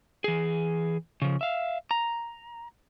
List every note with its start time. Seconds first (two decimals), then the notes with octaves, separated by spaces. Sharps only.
0.24 E3 G#4
1.22 C#3 F3
1.41 E5 F5
1.91 A#5